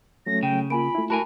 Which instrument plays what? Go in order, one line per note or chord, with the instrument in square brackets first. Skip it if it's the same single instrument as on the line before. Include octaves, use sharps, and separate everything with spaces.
[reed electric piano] F#3 A3 C#4 [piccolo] A#6
[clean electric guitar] C#3 [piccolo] G5
[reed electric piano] A#3 [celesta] F4 G#5 D7 [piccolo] B5
[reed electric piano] A3 E4
[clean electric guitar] F#4 A#4 G#5 [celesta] A5 B5